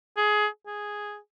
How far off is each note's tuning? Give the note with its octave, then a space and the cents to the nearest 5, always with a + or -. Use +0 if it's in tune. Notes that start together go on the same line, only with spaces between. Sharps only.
G#4 +20
G#4 +0